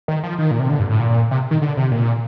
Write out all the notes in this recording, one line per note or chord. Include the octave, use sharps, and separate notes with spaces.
D#3
F3
D#3
A#2
C3
D3
G2
A2
A#2
C3
D#3
D3
C3
A#2